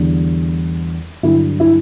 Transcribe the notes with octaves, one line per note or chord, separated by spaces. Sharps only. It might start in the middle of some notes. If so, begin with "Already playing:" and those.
Already playing: E2 D3 G3
G2 D3 F#3 E4
E4